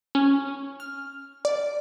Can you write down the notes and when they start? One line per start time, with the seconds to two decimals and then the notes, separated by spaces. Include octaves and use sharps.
0.15 C#4
0.80 F6
1.45 D5